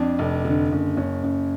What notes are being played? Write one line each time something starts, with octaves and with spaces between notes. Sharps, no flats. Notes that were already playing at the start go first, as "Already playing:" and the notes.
Already playing: F2 D4
F1
D3
F#1
F#1 C#4
F#1